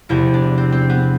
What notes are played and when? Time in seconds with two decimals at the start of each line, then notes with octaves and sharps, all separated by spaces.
0.09 E2 C3 F3 E4
0.34 D4
0.58 C4
0.72 C4
0.90 B3